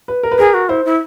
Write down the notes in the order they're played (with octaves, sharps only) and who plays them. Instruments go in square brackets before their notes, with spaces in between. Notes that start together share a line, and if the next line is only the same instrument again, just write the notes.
[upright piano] B4
A#4
B4
[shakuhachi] G#4 [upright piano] A#4
[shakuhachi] F#4
[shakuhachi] E4 [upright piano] C5
[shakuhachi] E4